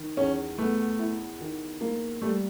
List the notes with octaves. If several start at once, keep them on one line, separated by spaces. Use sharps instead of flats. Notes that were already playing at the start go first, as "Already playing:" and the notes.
Already playing: D#3
E2 C#4
A3 B3
E4
D#3
A#3
G3 A3